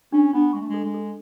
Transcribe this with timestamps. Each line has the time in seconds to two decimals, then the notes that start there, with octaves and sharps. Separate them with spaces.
0.12 C#4 D4
0.33 B3 D4
0.53 G#3 C#6
0.61 A3
0.69 G#3
0.74 A4
0.84 G#3
0.94 A4